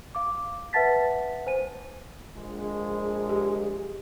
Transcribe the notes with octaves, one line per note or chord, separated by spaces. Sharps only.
F5 D6
B4 E5 F#5 A5 A6 B6
C5 G#5 D#7
A#1 G#3
G4